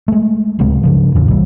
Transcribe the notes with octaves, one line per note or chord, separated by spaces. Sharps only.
G#3 A3
D1 C#2 C3 G#3
G2 C#3 F3
E2 A2 C#3 E3
C2 E3 G3